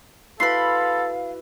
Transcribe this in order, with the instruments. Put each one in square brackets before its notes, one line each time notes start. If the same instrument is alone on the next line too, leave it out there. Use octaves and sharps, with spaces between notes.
[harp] E4 F#4 B4 [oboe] A4 [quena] F5 [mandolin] B5 C6